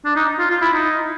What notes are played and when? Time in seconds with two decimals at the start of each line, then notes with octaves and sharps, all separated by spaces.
0.05 D4
0.16 D#4
0.39 F4
0.50 F4
0.62 E4
0.74 D#4